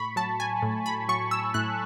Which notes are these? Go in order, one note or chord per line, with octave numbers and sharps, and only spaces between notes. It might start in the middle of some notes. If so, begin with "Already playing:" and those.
Already playing: A2 B5 C#6
F#3 A5
G#5
A2
B5
F#3 C#6
E6
A2 F#6